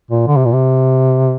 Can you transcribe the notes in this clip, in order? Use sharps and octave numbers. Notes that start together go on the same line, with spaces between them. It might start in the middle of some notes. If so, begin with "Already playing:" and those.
A#2
D3
C3
A#2
C3